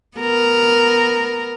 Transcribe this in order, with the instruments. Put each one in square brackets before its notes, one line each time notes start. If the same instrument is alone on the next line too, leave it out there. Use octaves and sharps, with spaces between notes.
[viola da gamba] B3 A#4